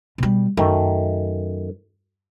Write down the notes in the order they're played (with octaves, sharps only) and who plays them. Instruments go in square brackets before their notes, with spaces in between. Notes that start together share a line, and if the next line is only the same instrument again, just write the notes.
[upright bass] B2 G3
[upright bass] F#2 [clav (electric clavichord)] D#3 A3